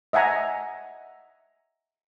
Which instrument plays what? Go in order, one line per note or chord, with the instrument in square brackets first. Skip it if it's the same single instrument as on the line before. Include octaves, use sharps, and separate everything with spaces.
[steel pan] D#5 E5 F#5 G#5 A#5